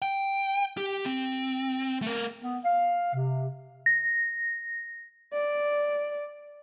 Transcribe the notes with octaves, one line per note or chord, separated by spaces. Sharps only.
G5
G4
C4
A3 A#4
B3
F5
C3
A#6
D5